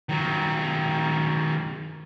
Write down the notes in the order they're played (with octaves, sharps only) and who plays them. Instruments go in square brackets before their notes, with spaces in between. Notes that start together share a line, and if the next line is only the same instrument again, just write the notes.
[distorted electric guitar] D#3 F#3